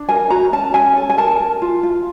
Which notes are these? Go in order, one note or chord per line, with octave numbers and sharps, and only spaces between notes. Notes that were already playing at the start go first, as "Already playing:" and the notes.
Already playing: D4
A#4 G#5
F#4 A#5
C#4 A5
C#4 G#5
A4
G#5
A#4 A5
A#4
F4
F4